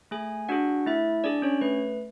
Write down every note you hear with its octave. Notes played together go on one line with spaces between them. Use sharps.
A3 G#4 G#5
D4 F#4 G#4 F#5
A3 E4 E5
D4 G#4 D5
C#4 C#5
A3 B4